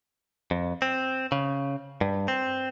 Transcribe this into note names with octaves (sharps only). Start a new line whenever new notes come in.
F2
C4
C#3
G2
C4